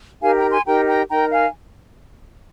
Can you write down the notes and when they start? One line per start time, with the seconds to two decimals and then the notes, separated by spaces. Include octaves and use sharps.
0.22 D#4 G4 A#4 F5 G#5
0.36 G5 A#5
0.51 G#5 C6
0.66 D#4 G4 A#4 G5 A#5
0.88 G5 A#5
1.10 D#4 A#4 G5 A#5
1.32 F5 G#5